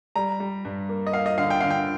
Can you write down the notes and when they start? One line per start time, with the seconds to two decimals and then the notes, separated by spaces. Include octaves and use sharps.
0.16 G3 A#5
0.40 G3
0.65 G2
0.89 A#3
1.07 D#5
1.13 A#3 F5
1.26 D#5
1.38 D3 F5
1.50 G5
1.60 D3 F5
1.70 G5